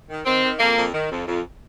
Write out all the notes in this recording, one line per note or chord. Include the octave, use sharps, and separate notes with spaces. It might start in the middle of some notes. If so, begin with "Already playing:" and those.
D#3
D#3 C4
D#3
F2 A#3
F2
D#3
F2
F2